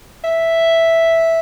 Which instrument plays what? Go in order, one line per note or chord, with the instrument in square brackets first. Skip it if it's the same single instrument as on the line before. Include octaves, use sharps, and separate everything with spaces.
[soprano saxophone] E5